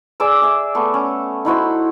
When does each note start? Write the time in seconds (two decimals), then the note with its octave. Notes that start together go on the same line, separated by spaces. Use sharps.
0.20 G#4 D5 D6 E6
0.42 G#4 E5
0.75 A3 B3
0.94 C#4
1.45 D#4 E4 F#4 C5